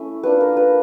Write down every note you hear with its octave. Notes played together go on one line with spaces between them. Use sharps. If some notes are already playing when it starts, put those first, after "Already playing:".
Already playing: A3 C#4 E4 E5
A#3 D4 F4 B4
A#4
B4